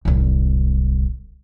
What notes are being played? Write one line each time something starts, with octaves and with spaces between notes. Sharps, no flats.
D1 C2